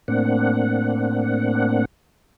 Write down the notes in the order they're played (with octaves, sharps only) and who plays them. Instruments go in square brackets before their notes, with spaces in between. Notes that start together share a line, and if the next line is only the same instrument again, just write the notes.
[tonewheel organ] A2 A#3 C4 D4 F#5